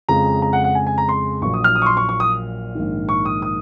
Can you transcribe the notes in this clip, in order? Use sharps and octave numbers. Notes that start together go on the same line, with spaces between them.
F2 C#3 F3 G#3 A#5
A#5
F#5
F#5
G#5
G#5
A#5
C6
A#1 A#2 F#3 C#6
D#6
F6
D#6
C#6
C6
C#6
C#6
D#6
A#1 G#2 D#3
C#6
D#6
D#6